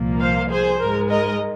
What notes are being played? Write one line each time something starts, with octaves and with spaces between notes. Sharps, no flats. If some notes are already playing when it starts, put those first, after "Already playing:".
Already playing: C2 A#2 F3 A#3
C5 F5
G#4 C5
G#2 G#3 A#4
A#4 D#5